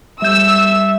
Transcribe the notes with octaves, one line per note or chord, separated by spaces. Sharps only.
G3 E5 E6 G6